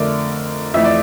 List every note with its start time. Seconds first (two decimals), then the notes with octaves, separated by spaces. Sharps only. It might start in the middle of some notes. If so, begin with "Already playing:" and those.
Already playing: F2 D3 A3 A#4 D5
0.74 F2 E3 A3 E5
0.84 D5